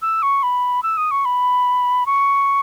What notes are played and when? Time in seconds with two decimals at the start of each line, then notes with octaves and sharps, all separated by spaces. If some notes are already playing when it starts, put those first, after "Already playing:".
0.02 E6
0.22 C#6
0.43 B5
0.83 E6
0.97 D#6
1.11 C#6
1.25 B5
2.06 C#6